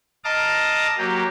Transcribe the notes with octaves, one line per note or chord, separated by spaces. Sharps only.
D#5 F5 A5 A#5 D6 D#6
F#3 A#3 G4